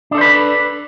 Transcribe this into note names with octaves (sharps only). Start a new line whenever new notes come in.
D4 A4 B4 C5